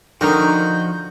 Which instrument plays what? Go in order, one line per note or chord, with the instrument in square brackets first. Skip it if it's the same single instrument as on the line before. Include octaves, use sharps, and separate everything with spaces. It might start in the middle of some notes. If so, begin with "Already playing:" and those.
[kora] D3 D#4 [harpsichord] D#3 [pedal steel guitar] F3 F#4 F6 [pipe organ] G6